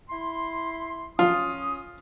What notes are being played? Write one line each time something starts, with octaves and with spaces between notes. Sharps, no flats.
E4 C6
C#4 F4 D#6